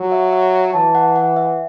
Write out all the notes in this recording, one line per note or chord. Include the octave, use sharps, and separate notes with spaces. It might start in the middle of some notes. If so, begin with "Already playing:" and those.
Already playing: F#3
E5
E5
E3 A5
F#5
F#5
E5